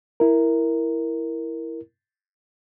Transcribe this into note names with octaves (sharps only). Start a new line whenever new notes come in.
E4 A#4